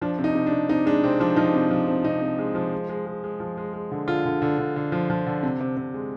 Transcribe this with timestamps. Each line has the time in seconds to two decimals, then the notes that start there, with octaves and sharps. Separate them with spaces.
0.02 F3 D4
0.19 C3
0.24 D#4
0.35 C3
0.47 D4
0.52 C3
0.69 C3 D#4
0.86 G#3 D4
1.04 C3 C4
1.20 F3 D4
1.36 F3 D#4
1.54 C3
1.71 F3
1.88 C3
2.04 C3 D#4
2.21 C3
2.39 G#3
2.55 F3
2.73 G#3
2.89 G#3
3.06 G#3
3.24 G#3
3.40 F3
3.57 G#3
3.73 G#3
3.91 D3
4.08 D3 F4
4.25 D3
4.42 D3
4.58 D3
4.76 D3
4.92 F3
5.10 F3
5.26 D3
5.43 C3
5.60 C3
5.77 C3
5.94 G#3